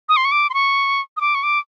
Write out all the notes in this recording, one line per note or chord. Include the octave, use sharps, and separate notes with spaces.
D#6
C6
C#6
D6
C6
C#6
D#6
D6
C#6
D6